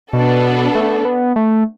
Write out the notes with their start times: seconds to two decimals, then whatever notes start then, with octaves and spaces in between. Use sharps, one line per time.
0.13 B2 B3 D4 A4
0.75 A3
1.05 B3
1.36 A3